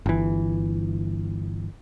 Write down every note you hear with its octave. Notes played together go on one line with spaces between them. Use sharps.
G1 E3